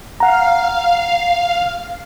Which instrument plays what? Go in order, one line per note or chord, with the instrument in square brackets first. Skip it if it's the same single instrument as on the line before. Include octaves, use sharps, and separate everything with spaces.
[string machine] F5 [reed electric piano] F#5 A#5